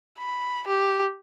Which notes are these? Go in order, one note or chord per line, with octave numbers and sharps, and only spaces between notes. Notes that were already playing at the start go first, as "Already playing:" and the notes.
B5
G4